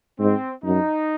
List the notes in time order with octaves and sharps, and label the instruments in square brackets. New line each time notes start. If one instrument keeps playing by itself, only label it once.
[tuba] G#2 [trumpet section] C4
[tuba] F#2 [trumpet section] D#4